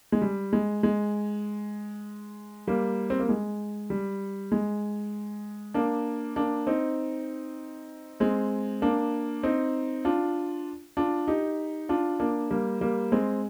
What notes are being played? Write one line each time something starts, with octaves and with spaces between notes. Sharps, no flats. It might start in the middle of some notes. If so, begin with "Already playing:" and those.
G#3
G3
G#3
G#3
G3 A#3
C4
A#3
G#3
G3
G#3
A#3 D4
A#3 D4
C4 D#4
G#3 C4
A#3 D4
C4 D#4
D4 F4
D4 F4
D#4 G4
D4 F4
A#3 D4
G3 A#3
G3 A#3
G#3 C4